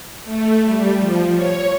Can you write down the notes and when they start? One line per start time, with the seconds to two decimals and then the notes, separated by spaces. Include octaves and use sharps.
0.23 A3
0.64 G3
0.99 F3
1.33 C#5